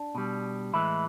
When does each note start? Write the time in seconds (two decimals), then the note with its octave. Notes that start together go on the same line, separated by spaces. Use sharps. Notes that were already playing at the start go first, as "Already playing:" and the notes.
Already playing: D4
0.15 B2 G3
0.73 A2 E3 G#3 E4